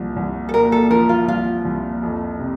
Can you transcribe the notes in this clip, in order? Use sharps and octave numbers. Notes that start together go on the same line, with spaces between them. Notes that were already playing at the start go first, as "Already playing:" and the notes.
Already playing: C2 A#2 F3
C2
A4
A#2 A#4
A4
F3 A#4
F4
C2 F4
C2
F2
C3